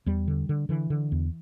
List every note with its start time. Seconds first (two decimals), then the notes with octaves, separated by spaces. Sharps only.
0.06 E2 G3
0.28 D3
0.49 D3
0.69 D3 E3
0.90 D3
1.12 E2